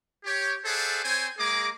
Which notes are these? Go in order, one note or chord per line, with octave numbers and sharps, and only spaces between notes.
G4 C#5
G#4 A4 C5 D5 E5 F#5
C4 C5 C#5 G5 G#5
G#3 A#3 G#4 A#5 D6